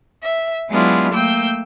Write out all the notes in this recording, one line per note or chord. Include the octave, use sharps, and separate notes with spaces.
E5
F#3 G#3 B3 D4 E4 F4
A3 A#3 G5 E6 G6